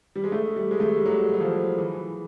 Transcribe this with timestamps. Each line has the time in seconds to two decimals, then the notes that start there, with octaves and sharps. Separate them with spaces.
0.16 G3
0.24 G#3
0.32 A3
0.56 G3
0.71 G#3
0.80 A3
0.96 G3
1.05 F#3
1.34 F#3
1.41 F3
1.78 E3